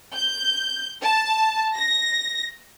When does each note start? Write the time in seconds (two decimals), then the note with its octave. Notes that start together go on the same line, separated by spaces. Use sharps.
0.14 G6
1.03 A5
1.76 A#6